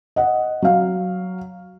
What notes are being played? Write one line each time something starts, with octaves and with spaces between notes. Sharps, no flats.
D#5 F#5
F#3 F5